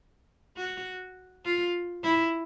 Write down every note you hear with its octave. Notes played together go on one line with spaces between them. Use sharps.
F#4
F4
E4